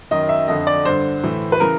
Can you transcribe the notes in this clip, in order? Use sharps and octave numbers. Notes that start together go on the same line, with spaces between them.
F#2 D#3 D#5
E5
F2 D3 D#5
D5
G2 D3 C5
A2 E3
B4
C#3 E3 A#4